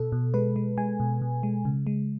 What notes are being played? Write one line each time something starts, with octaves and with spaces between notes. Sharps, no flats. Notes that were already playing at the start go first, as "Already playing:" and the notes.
Already playing: B2 A4
B2
G#3 B4
G#3
G#3 G#5
B2
B2
G#3
C#3
G#3